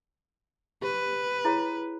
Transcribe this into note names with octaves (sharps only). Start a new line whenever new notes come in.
G4 B4
E4 G#4 C#5